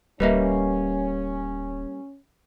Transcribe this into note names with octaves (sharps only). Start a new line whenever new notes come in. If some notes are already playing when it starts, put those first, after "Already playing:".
D1 G3 A#3 C#4 B4 D#5 E5